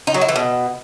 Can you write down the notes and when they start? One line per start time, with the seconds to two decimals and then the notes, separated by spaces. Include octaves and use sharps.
0.07 D#4
0.14 F#3
0.21 E4
0.29 E3
0.36 B2